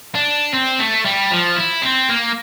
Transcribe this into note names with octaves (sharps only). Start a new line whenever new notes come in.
D4
C4
A3
G3
F3
E4
C4
A#3